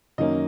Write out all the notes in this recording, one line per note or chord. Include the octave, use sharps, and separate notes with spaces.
F#2 D#3 A#3 C#4 D#5